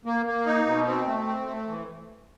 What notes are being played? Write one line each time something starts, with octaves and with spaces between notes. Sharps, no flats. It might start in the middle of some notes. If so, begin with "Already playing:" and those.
A#3
A#3
D#4
B2
C4
A3
C4
A3
E3